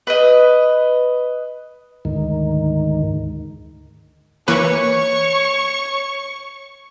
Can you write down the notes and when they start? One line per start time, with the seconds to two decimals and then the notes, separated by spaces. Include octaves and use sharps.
0.07 B4 D#5
2.05 D2 G#2 D#3
4.48 E3 A#3 B4 C#5 C#6